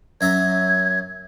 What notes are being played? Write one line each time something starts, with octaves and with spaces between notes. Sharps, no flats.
F#2 E5 A#5 G#6